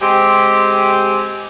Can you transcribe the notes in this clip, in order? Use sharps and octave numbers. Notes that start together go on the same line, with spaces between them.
G#3 C4 G4